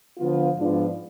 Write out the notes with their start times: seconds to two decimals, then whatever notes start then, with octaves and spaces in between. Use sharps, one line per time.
0.18 D3 F3 B3 F4
0.57 G#2 F3 B3 D4 F4